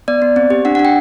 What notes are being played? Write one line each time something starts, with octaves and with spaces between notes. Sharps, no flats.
B3 D5
B3
C4
G4
D4 F#5
F#5
D4
G5